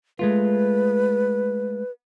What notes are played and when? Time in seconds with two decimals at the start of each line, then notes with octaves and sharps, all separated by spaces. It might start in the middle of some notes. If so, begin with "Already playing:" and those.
0.19 G#3 A3 F4 B4